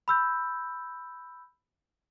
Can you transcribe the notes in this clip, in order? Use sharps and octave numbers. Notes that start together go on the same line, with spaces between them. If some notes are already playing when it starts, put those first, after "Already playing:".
B5 E6 G6